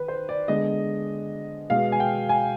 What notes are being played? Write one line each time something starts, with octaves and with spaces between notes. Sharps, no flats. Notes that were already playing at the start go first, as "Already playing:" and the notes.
Already playing: D#3 B4
C5
D5
D3 G#3 B3 D#5
B2 G#3 B3 F5
G#5
G5
G#5